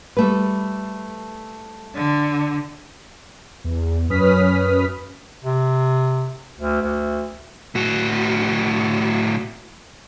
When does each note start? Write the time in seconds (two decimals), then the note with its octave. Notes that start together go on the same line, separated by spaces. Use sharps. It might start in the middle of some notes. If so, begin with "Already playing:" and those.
0.17 G3 A3 B4
1.94 D3
3.64 E2
4.09 F#2 C#4 B4 D#6 F6 B6
5.43 C3
6.59 D2
6.82 D2
7.75 A2 F#4